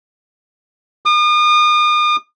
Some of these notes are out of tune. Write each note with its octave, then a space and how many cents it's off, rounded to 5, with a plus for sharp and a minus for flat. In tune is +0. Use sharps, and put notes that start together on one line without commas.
D#6 -40